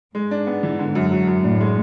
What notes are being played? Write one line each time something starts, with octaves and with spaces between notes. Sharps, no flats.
G#2 G#3
D4
B3
E3
D3
F#2
F#3
F#2
A2 D4
G#3